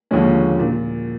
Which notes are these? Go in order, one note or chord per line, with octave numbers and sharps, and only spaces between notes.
D#2 D3 F3 G#3 C#4
A#2